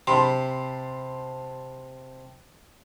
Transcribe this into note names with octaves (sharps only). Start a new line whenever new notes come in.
C3 A5 B5 C6